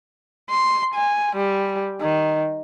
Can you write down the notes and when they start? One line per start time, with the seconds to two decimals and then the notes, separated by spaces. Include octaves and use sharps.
0.50 C6
0.94 G#5
1.36 G3
2.01 D#3